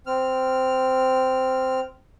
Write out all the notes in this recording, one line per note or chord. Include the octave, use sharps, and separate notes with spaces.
C4 F6